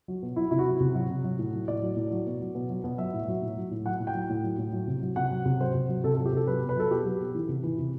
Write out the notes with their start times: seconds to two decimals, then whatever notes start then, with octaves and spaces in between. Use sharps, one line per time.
0.08 F#3
0.22 B2
0.36 F#3 E4
0.51 C3 E4
0.59 F#4
0.66 F#3
0.80 C3
0.95 F#3
1.10 C3
1.24 F#3
1.39 A2
1.53 F#3
1.68 A2 D5
1.82 F#3
1.97 A2
2.11 F#3
2.26 B2
2.41 F#3
2.55 B2
2.70 F#3
2.84 B2
2.98 F#3 E5
3.13 A2
3.28 F#3
3.42 A2
3.57 F#3
3.71 A2
3.86 F#3 F#5
4.00 A2
4.07 G5
4.15 F#3
4.29 A2
4.44 F#3
4.58 A2
4.73 F#3
4.87 C3
5.02 F#3
5.16 C3 F#5
5.31 F#3
5.46 C3
5.60 F#3 C5
5.74 C3
5.89 F#3
6.04 C3 A4
6.15 F#3 A4
6.26 G4
6.33 C3 A4
6.47 F#3 B4
6.62 B2
6.69 B4
6.76 F#3 A4
6.91 B2 G4
7.05 F#3
7.20 B2
7.35 E3
7.49 C3
7.63 E3
7.78 C3